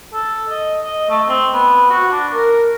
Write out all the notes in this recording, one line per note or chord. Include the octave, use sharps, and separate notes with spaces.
A4
D#5
D#5
A3
C4
B3
F#4
D4
A#4